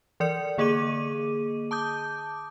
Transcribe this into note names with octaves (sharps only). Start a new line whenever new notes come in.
E3 A#4 D5 C#7
D3 A#3 G#4 D#5 D6 D#7
A5 D6 D#6 G6